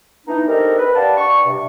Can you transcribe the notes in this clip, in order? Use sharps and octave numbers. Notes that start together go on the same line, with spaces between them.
E3 B3 D4 D#4
C4 D4 D#4 G4 A4 A#4
B4
G4 B4 D5 F5 F#5 A5
D4 D5 C#6
G2 C3